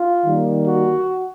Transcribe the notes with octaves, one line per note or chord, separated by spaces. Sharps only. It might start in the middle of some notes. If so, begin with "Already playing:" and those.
Already playing: F4
D#3 G3 A#3
F#4